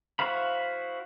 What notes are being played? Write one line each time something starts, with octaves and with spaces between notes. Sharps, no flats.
E4 F#4 C5 F5 B5